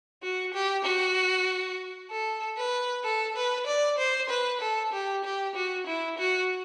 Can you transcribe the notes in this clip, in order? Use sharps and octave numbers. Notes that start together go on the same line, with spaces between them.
F#4
G4
F#4
A4
B4
A4
B4
D5
C5
B4
A4
G4
G4
F#4
E4
F#4